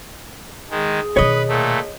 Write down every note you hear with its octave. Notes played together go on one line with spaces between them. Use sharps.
D#3 G#3 G#4
B2 D#3 B4 C#5 D#5
A#2 A3